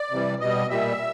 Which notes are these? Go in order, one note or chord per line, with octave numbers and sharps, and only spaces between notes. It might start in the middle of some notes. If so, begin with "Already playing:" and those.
Already playing: D5
C3 E3 G3
B2 G3 D#5
A#2 G3 E5